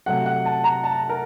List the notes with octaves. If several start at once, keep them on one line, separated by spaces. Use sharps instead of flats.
C3 F#3 A3 F#5
F#5
A5
A#5
A5
A#4